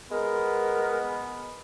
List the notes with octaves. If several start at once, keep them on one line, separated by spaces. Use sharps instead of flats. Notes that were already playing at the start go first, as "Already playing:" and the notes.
G#3 B3 A#4